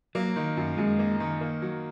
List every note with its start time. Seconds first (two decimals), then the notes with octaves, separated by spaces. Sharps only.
0.15 F#3 A#3
0.36 D#3
0.57 F#2
0.77 F#2 G#3
0.99 A#3
1.20 D#3
1.41 A#3
1.62 F#3